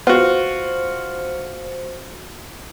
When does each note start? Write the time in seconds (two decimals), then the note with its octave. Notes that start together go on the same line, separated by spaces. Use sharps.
0.07 B3 F4 F#4 B4 C5 F5